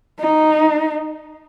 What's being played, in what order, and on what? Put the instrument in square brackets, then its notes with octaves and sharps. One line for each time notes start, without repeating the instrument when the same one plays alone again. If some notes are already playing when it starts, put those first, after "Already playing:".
[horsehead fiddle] D#4